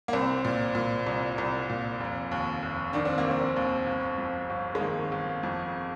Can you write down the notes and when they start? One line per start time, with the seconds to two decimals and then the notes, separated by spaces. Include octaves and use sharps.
0.08 A#3
0.13 C2 C4
0.45 A#2
0.75 A#2
1.06 C2
1.38 C2
1.70 A#2
2.00 F1
2.32 D#2
2.62 F1
2.93 D#3 D4
3.05 C4
3.18 A#3
3.24 F1
3.31 C4
3.56 D#2
3.86 G1
4.18 F2
4.50 G1
4.75 G#3
4.81 D#3 A#3
5.12 G1
5.43 F2